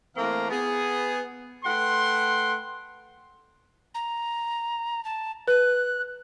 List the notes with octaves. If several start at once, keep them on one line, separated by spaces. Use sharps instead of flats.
E3 A3 A#3 C4 F5 A#5
B3 G#4
A3 B4 F#5 G5 C6
A#5
A5
B4 F#6